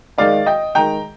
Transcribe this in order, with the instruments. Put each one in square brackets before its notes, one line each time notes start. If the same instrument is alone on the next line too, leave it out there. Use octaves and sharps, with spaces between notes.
[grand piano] D#3 G#3 D#4 D5 F5
D#5 G5
D#3 G#3 D#4 G5 A#5